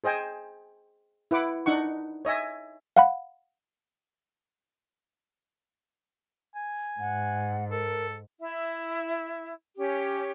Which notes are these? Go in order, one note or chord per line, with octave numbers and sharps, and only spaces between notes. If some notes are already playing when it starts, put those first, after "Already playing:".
G#4 C5 D#5 G5 G#5
E4 B4 F#5 D6
D4 D#4 F#5 C#6
C#5 D#5 E5 G#5
F5 F#5 B5
G#5
G#2 F#5
A4 A#4
E4 E5
C#4 G4